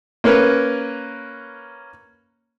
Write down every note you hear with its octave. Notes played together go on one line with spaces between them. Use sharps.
A#3 C#4 A#4 B4